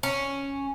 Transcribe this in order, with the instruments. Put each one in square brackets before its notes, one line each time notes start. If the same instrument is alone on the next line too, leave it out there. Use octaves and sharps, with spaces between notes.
[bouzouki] C#4